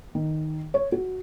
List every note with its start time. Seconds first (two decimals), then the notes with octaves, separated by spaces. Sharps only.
0.15 D#3
0.74 C#5
0.92 F#4